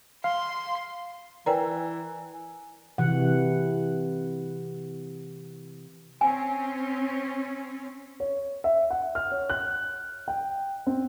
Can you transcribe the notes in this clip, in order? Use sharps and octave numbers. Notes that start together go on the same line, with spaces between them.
F5 C6
E3 A#4 B4 D5 G5 G#5 A#5
C3 E3 F#5
C4 C#4 G#5
C#5
E5
F#5
F6
C#5
F#6
G5
C4